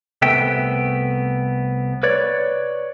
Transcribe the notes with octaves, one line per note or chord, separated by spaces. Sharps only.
C2 C3 A3 B3 E5 G5
B4 C#5 D5